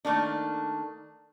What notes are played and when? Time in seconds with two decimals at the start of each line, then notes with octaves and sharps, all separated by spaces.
0.05 D#3 A3 A#3 D4